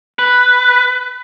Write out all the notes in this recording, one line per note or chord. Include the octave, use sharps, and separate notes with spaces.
B4